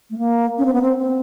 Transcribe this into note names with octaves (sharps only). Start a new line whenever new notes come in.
A3
A#3
C#4
C4
B3
C4
C4